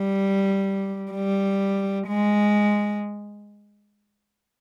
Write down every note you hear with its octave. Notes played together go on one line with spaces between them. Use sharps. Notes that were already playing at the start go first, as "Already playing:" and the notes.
Already playing: G3
G3
G#3